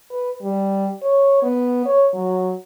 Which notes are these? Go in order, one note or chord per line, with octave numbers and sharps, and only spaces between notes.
B4
G3
C#5
B3
C#5
F#3